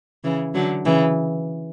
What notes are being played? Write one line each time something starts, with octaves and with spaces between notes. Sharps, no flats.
C#3 E3
D3 F#3
C#3 E3